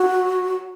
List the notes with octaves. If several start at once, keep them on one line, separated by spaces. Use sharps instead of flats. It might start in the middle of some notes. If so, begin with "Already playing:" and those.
Already playing: F#4